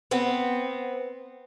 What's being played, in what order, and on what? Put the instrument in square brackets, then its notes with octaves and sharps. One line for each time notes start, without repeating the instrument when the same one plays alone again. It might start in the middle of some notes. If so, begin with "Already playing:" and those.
[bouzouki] B3 C4